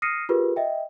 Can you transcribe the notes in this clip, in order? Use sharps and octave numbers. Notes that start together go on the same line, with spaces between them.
D#6 F6 A#6 C7 C#7 D#7
F4 G4 G#4 A#4 B4
D#5 E5 G5